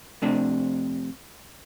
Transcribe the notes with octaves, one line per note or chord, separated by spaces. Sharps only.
F2 C3 A3 D4